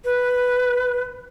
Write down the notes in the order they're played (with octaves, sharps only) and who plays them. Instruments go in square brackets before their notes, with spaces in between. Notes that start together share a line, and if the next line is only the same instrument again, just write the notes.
[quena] B4